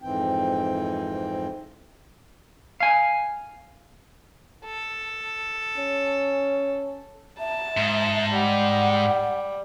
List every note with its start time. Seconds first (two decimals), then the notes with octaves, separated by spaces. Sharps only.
0.02 F2 G#2 E3 C4 G5
2.80 F5 G#5
4.65 A4
5.78 C#4
7.40 E5 A5
7.77 G#2
8.33 G3 F#5